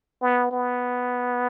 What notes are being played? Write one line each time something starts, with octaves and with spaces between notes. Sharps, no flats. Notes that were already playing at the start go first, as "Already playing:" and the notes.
B3
B3